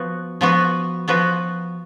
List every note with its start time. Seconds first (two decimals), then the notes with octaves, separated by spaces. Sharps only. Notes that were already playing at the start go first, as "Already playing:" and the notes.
Already playing: F3 B3 F#4 B4
0.41 F3 B3 F#4 B4
1.08 F3 B3 F#4 B4